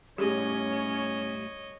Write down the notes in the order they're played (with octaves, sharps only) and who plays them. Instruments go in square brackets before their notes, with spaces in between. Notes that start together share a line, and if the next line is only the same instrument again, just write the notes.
[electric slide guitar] A2 G3 [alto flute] C#4 [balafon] G4 G#4 [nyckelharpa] C#5 D#5